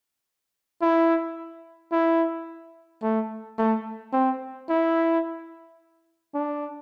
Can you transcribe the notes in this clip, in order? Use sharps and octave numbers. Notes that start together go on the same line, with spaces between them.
E4
E4
A3
A3
C4
E4
D4